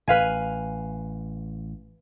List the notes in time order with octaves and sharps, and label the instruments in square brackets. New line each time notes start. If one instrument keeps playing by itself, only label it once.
[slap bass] A1 [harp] B4 F5 G#5